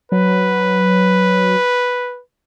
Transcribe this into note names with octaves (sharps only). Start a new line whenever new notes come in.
F#3 B4